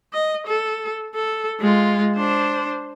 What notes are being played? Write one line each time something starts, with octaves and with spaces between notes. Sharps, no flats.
D#5
A4
A4
G#3 F4
D4 C5